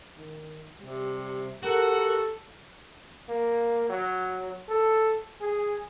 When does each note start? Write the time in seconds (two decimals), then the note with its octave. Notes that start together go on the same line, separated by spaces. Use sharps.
0.18 D#3
0.80 C3 G3
1.63 F#4 G4 A4 A#4 F#5
3.29 A#3
3.89 F#3
4.69 A4
5.41 G#4